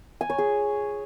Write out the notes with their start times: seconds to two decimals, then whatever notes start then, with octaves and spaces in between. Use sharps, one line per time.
0.21 G#5
0.30 C#5
0.38 G#4